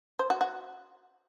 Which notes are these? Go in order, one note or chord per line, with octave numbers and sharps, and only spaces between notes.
C5
F#4
F#4